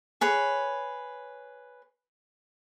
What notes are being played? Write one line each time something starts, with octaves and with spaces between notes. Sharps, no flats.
G#4 B4 C#5